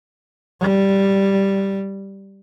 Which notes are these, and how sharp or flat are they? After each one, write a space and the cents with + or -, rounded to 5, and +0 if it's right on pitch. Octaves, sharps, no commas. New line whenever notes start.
G3 -5